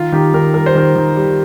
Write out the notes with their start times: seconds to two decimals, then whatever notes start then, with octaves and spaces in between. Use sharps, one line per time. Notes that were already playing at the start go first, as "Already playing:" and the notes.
Already playing: D#3 F4
0.12 D#3 G4
0.34 D#3 A#4
0.54 G3 A#4
0.66 C5
0.75 D#3 A#4
0.96 D#3
1.16 G3